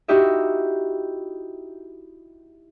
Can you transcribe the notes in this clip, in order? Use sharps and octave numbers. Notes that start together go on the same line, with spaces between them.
D#4 E4 F#4 G4 D#5 E5